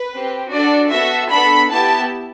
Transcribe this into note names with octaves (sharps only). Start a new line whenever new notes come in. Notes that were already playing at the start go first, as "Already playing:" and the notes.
Already playing: B4
C4 G4
D4 F#4 A4 D5
B3 F#4 A4 E5
B3 D4 A4 B5
B3 E4 G4 A5